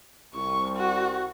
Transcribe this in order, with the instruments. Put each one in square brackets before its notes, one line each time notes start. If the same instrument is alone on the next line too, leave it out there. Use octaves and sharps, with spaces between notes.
[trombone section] C2 G3 [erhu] C#6
[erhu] F#4